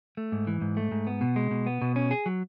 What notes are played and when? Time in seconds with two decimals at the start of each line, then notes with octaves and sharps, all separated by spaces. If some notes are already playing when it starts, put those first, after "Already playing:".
0.17 A3
0.32 G#2
0.47 E3
0.61 G#2
0.77 A3
0.92 G#2
1.07 B3
1.21 B2
1.36 G#3
1.51 B2
1.66 B3
1.82 B2
1.96 C#4
2.11 G#4
2.26 F#3